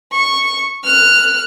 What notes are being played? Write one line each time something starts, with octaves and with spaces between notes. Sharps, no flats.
C#6
F6 F#6